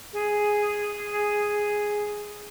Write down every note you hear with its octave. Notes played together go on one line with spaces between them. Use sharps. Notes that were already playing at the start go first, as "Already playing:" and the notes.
G#4